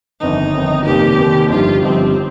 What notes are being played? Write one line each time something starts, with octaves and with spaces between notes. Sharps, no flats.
G1 F2 D#3 D#4
G1 F2 D#3
F1 D#2 D#3 A#3 G4
F1 D#2 D#3 A#3
G1 G2 F3 D#4 F4 G4
G1 G2 F3 C4 D#4 G4
C4